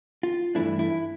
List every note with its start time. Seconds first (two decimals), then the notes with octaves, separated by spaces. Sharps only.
0.23 F4
0.55 G2 E3 A3 D4 E4
0.79 E4